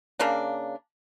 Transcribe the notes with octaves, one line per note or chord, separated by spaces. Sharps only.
C#3 A#3 D4